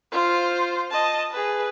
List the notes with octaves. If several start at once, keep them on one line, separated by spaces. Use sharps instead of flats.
F4 C5
D#5 A5
G#4 B4